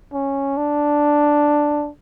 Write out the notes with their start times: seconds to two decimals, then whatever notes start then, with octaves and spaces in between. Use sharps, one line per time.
0.13 C#4
0.57 D4